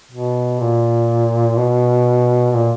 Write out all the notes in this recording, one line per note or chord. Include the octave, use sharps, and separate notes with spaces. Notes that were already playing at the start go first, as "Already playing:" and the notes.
B2
A#2
B2
A#2